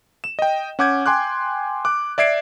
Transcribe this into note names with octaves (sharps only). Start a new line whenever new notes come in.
E7
D#5 G5
C#4 F#5 D6 G6 G#6
G5 G#5 C6 D6 F#6
D6 F#6
D5 E5 G#6 C7 D7